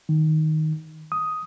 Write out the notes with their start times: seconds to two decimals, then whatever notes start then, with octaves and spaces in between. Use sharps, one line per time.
0.09 D#3
1.12 D#6